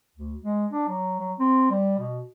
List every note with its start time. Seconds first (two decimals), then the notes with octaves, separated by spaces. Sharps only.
0.16 D2
0.43 G#3
0.72 D4
0.88 F#3
1.19 F#3
1.39 C4
1.70 G3
1.99 B2